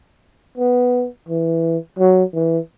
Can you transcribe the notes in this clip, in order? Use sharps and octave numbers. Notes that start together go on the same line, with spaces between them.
B3
E3
F#3
E3